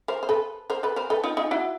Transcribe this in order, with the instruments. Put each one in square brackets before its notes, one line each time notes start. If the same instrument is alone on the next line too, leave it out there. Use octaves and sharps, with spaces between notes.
[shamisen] A#4 C5
C5
A4 B4
A#4 C5
A4 B4
A#4 C5
A4 B4
D#4 F4
D#4 F4
E4 F#4